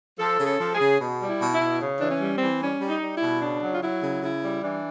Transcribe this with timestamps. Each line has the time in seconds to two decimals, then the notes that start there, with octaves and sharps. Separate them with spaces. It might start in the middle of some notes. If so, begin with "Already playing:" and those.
0.19 F3 A4
0.39 C#3
0.46 A4
0.61 F3
0.73 G#4
0.80 C#3
1.01 B2
1.20 G3
1.27 E4
1.41 B2
1.54 E4
1.60 B2
1.81 C#3
1.99 E3 D4
2.08 C#4
2.21 G3
2.35 C4
2.41 E3
2.61 G3 C#4
2.81 G3
2.88 D#4
3.02 G3
3.15 E4
3.22 B2
3.41 C#3 D4
3.62 F#3
3.71 F4
3.82 F#3 E4
4.02 C#3
4.22 C#3 E4
4.43 G3
4.62 E3 D4